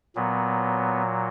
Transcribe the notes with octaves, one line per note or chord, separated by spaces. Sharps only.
A#2 F#3 B3